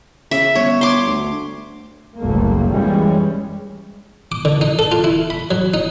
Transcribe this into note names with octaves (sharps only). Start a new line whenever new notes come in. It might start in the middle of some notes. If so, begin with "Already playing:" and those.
C#3 E5
G1 C#5
C6 D6
D2
F#1 C2 F#2 A3 A#3
F#2 E3 G3 G#3 C#4
D6
D3
D#4
A4
F4
E4
B5
F#3
D#4